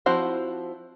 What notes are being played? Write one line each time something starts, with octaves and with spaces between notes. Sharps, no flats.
F3 C4 E4 F#4 C5